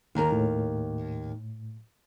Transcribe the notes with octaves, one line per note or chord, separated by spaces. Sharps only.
D#2 D#3 A#4 A#5
A2